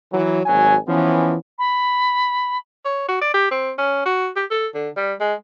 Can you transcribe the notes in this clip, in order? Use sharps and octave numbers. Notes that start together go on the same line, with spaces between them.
E3 F#3
G#1 F#3 G#5
E3 F3 B3 C#4
B5
C#5
F#4
D5
G4
C4
C#4
F#4
G4
A4
D3
G3
G#3